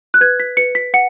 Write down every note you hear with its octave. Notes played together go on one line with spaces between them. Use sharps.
F#6
B4 G#6
B6
B4 C#7
B6
F#5 C#7